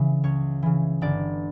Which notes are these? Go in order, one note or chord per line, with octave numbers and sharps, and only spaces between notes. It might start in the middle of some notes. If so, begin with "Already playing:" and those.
Already playing: C#3 E3
C#2 C#5
C#3 E3
G1 D5